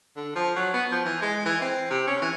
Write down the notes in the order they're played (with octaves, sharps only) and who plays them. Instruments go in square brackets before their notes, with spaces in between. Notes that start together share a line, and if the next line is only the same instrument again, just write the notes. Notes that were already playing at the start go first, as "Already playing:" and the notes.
[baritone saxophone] D3
F3
F#3
B3
F3
E3
G#3
E3
C4
C3
C#4
E3